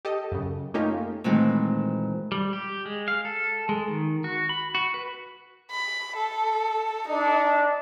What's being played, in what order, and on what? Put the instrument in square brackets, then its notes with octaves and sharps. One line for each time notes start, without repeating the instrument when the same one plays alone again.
[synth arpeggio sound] G4 A4 D#5
F#2 C#3
A3 A#3 C#4 D#4 F4 G4
[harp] A#2 D#3 E3 G#3 A3 C4
[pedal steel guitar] G3
G4
G#3
F5
A4
G#3
D#3
F#4
B5
F#4
B4
[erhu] B5
A4
[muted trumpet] D4 [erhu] D#4